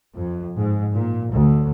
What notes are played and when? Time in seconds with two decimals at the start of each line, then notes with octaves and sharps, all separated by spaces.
0.14 F2
0.57 G#2
0.93 A#2
1.31 D2